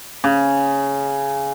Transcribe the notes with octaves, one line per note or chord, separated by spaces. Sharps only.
C#3